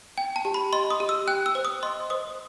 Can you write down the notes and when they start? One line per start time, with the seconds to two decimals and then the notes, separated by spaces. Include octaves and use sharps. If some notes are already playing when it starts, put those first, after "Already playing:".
0.18 G5
0.36 A5
0.45 G4
0.54 B5
0.73 D#5 C6
0.90 D#6
1.00 G4
1.09 E6
1.28 G5 F#6
1.46 E6
1.55 C5
1.65 D#6
1.83 D#5 C6
2.10 C5 D#6